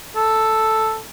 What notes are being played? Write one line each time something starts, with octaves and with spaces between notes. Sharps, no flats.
A4